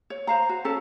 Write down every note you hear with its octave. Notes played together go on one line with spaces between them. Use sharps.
C#5
C5 F5 A#5
F#4
C#4 A4 A5